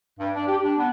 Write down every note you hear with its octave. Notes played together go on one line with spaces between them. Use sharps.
G2
D4
G4
D4
B3